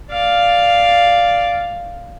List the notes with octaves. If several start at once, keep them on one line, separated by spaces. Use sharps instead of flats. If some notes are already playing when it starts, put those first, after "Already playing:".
D5 F5